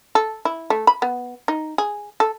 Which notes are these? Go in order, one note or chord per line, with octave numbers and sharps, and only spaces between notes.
A4
E4
A3
B5
B3
D#4
G#4
A4